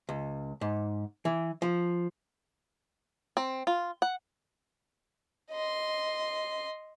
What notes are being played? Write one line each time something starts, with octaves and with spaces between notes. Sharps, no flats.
C#2
G#2
E3
F3
C4
F4
F#5
D#5 C6